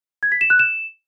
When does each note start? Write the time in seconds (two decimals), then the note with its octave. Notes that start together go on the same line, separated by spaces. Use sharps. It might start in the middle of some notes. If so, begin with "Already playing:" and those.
0.23 G#6
0.32 B6
0.41 E7
0.50 F#6
0.59 E7